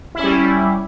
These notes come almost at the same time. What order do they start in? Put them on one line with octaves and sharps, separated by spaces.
E4 C#4 G3